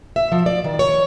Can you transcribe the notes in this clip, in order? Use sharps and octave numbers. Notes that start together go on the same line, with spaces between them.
E5
F3
D5
D#3
C#5